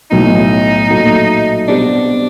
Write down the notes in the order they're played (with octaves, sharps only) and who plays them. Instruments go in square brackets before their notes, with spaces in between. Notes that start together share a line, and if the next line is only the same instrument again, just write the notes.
[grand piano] B1 A2 F#3 [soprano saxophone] D#4
[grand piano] A#2 F#3 A3
[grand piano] B2 G3 C4 [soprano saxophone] D4